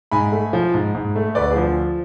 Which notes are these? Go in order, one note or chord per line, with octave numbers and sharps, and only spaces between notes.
G#2 G#5 B5
A3
F3
G#2
G#2
A3
D2 B4 D5
F3 G#4